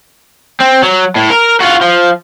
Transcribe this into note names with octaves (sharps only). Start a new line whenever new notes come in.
C4
F#3
A2
A#4
F4 F#4
F3